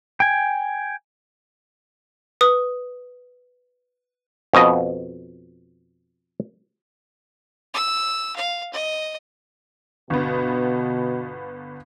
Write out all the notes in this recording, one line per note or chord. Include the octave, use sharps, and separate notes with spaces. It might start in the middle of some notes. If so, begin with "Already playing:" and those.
G5 G#5
B4 D#6
F2 B2 D#5
E6
F5
D#5
G1 B2 B3